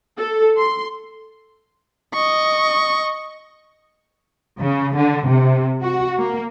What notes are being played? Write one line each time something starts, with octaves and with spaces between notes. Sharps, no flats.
A4
C6
D#5 C#6
C#3
D3
C3
F#4
A#3